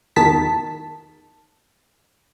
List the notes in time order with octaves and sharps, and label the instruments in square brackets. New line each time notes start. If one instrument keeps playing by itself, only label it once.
[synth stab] E2 D#3 A5 B6